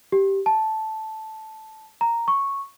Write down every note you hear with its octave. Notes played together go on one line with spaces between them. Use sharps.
G4
A5
A#5
C#6